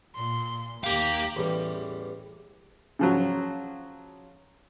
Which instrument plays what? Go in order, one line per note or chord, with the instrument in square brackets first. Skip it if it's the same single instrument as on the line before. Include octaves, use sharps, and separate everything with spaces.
[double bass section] A#2 [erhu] C6
[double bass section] D#2 [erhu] G4 [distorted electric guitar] A#4 F5
[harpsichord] A1 E2 G3
[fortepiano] C#3 F3 F#3